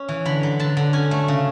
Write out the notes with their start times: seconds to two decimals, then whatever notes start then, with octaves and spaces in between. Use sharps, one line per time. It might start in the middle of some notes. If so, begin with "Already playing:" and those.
Already playing: C#4
0.09 E3
0.26 D3 B5
0.43 F#3
0.60 D3 A5
0.77 D3
0.93 C#4 G#5
1.11 A3
1.28 C#3